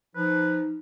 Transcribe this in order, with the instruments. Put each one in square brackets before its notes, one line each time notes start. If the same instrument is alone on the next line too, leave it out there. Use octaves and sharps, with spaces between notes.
[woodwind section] F3 [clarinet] D#4 [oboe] B4